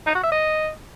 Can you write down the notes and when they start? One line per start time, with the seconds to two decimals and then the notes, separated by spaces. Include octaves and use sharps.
0.06 D#4
0.15 F#4
0.23 E5
0.32 D#5